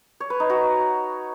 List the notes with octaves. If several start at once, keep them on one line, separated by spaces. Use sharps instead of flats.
C#5
B4
D#4
F#4